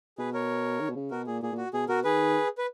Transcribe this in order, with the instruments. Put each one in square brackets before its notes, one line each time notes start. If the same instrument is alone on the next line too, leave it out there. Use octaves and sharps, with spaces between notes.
[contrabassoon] B2 [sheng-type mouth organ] G#4 B4
[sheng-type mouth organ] A#4 C#5
[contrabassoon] D#3
B2
C#3
[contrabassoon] B2 [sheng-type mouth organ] F#4 A#4
[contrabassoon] A#2 [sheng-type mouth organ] G#4
[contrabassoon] A#2 [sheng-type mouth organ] G#4
[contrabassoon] A#2
[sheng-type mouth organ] F#4
[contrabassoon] B2 [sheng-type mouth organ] G#4
[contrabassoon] B2 [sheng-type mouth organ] F#4 A#4
[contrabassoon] D#3 [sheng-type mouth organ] G#4 B4
[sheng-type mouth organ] B4